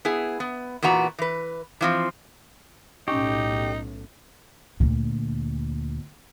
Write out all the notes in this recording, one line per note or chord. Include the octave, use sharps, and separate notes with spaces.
B3 E4 G#4
B3
E2 A#2 B3 F#4 A#5
E3 B4
E3 F3 C4
B1 A2 C#4 D#4 G4 G#5 C#6
D2 A#2